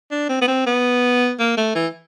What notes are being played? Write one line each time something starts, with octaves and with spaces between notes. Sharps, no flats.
D4
C4
B3
C4
B3
A#3
A3
E3